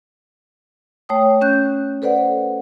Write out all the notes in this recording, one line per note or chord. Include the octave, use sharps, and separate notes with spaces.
A3 C#5 G5 D#6
C#4 F#6 G6
A4 B4 C5 D5 F#5